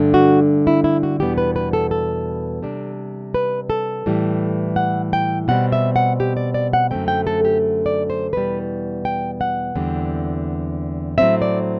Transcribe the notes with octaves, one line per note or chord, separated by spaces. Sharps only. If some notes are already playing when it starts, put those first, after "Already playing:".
Already playing: G2 D3 A3 D4
F#4
E4
E4
F#4
E2 B2 G3 B3 G4
B4
B4
A4
A4
C3 G3 D4
B4
A4
A2 E3 G3
F#5
G5
B2 G3 C4 F#5
E5
F#5
G4
D5
D5
F#5
F#2 D3 A3 C4 G5
G5
A4
G4
D5
C5
E2 B2 G3 B4
G5
F#5
E2 D3 G3 C4
A2 F#3 C4 E5
D5